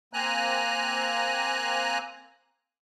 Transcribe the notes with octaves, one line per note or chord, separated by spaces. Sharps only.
A#3 C4 G#5 A#5 F#6